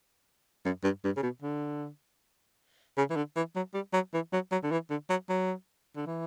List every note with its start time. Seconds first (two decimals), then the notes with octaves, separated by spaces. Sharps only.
0.65 F#2
0.84 G2
1.04 G2
1.17 C#3
1.23 B2
1.42 D3
2.97 C#3
3.10 E3
3.16 D3
3.36 E3
3.56 F#3
3.74 G3
3.93 F#3
4.14 E3
4.33 F#3
4.52 F#3
4.63 D3
4.71 E3
4.90 D3
5.10 F#3
5.29 F#3
5.96 D3
6.06 E3